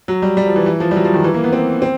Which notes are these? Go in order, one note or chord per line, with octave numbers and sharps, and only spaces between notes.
F#3
G3
G3
F3
E3
E3
F3
G3
F#3
F3
D#3
E3
A#3
B3
C4
C4